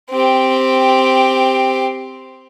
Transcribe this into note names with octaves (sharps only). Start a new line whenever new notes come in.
C4 G4